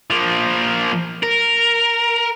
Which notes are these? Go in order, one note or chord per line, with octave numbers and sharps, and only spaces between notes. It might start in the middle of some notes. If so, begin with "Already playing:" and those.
F3 A#3
A#4